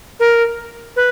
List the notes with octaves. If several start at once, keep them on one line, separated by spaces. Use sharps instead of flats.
A#4
B4